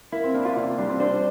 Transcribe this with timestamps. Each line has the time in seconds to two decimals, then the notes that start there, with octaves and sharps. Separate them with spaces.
0.12 A#3 E4
0.24 C4
0.34 A#3 D4
0.45 F4
0.56 C3 F4
0.78 G3 D4
0.89 C4
1.00 D4 C5